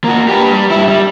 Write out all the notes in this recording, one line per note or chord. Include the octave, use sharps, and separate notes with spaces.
A#3 F#4
G4 B4
G3
G2 E4
G3